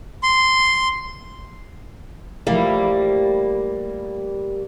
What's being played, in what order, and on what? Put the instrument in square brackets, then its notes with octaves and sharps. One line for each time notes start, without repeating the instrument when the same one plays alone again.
[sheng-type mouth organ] C6
[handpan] F3 A3 E4 [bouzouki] G3 A#3